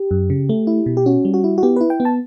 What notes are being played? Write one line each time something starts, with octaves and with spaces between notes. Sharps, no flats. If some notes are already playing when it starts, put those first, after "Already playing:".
Already playing: G4
F#2
C#3
A3
E4
B2
G4
C#4 F#4
G3
F#4
E4
F#4
B3 G4
E4 B4
G5
B3
A5